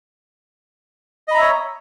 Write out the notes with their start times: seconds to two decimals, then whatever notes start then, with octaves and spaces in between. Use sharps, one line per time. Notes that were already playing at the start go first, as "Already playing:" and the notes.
1.28 D#5
1.31 B5
1.35 A#5
1.38 E5
1.41 C#5